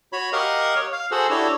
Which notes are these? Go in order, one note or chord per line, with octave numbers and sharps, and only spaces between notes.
F#4 C#5 B5
G4 A#4 D#5 F5 F#5
C#5
F5
F#4 G#4 A4 C5 F#5
D4 E4 F#4 G4 A4 C#5